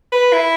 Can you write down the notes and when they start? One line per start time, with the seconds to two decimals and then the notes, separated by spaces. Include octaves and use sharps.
0.12 B4
0.33 E4